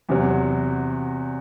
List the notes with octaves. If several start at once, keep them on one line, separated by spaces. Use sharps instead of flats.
E2 C3 F#3